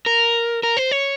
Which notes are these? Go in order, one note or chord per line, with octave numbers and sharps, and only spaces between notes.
A#4
A#4
C5
C#5